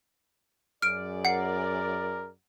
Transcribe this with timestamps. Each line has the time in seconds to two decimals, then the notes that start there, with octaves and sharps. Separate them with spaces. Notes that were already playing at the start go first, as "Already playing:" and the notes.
0.82 F#2 G#4 D5 F6 D7
1.25 A#4 F#5 C7